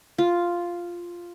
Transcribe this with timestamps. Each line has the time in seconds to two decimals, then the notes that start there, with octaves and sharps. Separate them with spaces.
0.18 F4